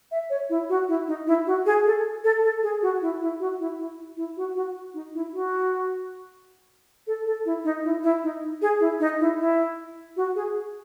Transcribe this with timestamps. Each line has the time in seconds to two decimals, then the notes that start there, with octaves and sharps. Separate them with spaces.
0.11 E5
0.30 C#5
0.50 E4
0.69 F#4
0.88 E4
1.08 D#4
1.27 E4
1.47 F#4
1.66 G#4
1.86 A4
2.24 A4
2.43 A4
2.63 G#4
2.82 F#4
3.02 E4
3.21 E4
3.40 F#4
3.59 E4
3.78 E4
4.17 E4
4.37 F#4
4.55 F#4
4.94 D#4
5.14 E4
5.33 F#4
7.07 A4
7.26 A4
7.45 E4
7.64 D#4
7.84 E4
8.03 E4
8.23 D#4
8.62 G#4
8.80 E4
9.00 D#4
9.20 E4
9.39 E4
10.17 F#4
10.35 G#4